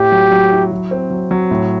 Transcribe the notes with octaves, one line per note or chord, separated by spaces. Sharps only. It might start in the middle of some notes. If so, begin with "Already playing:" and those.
Already playing: A2 G4
F#3
F#3
E4
F#3
C4
F#3
F#3
A2